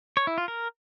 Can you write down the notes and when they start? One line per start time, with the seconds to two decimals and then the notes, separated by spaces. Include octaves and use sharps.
0.17 C#5
0.27 E4
0.38 F4
0.48 A#4